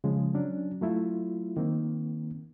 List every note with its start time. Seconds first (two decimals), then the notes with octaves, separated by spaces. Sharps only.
0.04 C#3 F3 G#3
0.34 F#3 C#4 D4
0.81 F#3 A3 E4 F4
1.57 D#3 A#3 C4